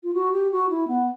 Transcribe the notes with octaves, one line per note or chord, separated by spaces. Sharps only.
F4
F#4
G4
F#4
E4
B3